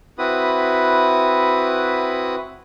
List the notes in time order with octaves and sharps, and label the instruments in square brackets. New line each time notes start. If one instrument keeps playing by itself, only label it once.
[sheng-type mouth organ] C4 E4 F#4 B4 B5 D#6